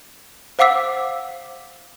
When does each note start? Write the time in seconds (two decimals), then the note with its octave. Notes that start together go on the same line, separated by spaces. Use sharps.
0.59 C5 F5 F#5 D6 E6 B6